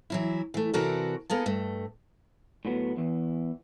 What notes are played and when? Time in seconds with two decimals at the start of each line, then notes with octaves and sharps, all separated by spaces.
0.10 E3 F#3 E4
0.54 E3 A3
0.73 C3 E3 F#4 A4 A#4 D5
1.30 A#3 B3 G#4 A4
1.46 G2 A3
2.65 A2 F#3 B3
2.97 E2 E3